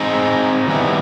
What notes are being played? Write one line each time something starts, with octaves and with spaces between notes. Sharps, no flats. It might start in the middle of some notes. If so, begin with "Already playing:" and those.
Already playing: C4 D#4 G#4
D#3 G3 B3 E4